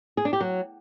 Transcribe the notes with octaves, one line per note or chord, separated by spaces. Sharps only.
G#4
D4
G4
F#3